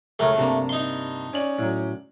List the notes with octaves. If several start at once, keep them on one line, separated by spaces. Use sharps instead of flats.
C#2 A3 A4 A#4 C#5
G2 C3 A#3
D#4 C6
C#4 D5 F#7
A2 F#3